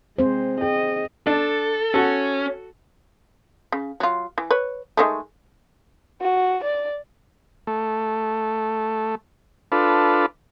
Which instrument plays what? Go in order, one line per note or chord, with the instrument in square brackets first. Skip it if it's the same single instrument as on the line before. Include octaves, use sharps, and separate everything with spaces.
[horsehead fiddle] G#3 [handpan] C4 C5
[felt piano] G#4 G5 [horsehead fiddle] D#5
[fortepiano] D4 [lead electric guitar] A4
[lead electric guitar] C#4 [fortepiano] F#4 A4
[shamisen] C#3
F#3 F4
E3
B4 C#5
D#3 G#3 A3
[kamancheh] F#4
D5
[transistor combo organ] A3
D4 F4 A4 B4